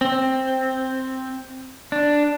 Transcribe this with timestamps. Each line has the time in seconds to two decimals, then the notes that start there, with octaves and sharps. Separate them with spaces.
0.01 C4
1.92 D4